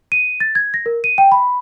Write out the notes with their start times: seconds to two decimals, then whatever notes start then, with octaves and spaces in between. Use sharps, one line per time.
0.12 D#7
0.40 A6
0.55 G#6
0.74 A#6
0.86 A#4
1.04 D#7
1.18 G5
1.32 B5